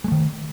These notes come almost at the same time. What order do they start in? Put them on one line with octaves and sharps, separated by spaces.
G#3 A3 D#3